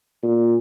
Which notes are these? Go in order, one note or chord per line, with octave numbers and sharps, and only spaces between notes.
A#2